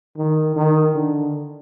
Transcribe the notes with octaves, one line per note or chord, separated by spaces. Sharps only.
D#3
D#3
D3